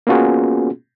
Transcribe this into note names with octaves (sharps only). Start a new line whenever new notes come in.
A#3 B3 C#4 F4 F#4 G#4